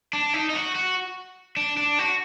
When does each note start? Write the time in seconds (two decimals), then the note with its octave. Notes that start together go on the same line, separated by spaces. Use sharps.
0.13 D4
0.34 D#4
0.49 D#4
0.55 F#4
0.75 F#4
1.57 D4
1.77 D4
1.99 F#4